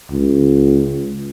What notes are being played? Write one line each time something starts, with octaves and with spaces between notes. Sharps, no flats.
C#2